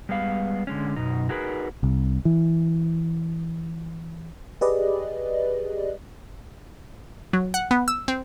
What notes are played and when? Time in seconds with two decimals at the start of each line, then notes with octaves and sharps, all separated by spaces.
0.09 G3 G#3 B3 F5
0.67 D3 G#3 C#4
0.96 F#2 B2 D#4
1.29 D#4 F#4 G#4 A#4 B4
1.83 C2
2.25 E3
4.61 G4 G#4 B4 D5 D#5
7.33 F#3
7.54 F#5
7.71 B3
7.88 E6
8.08 C4